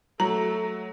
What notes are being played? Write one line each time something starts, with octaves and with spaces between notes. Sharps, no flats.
F#3 A3 A#5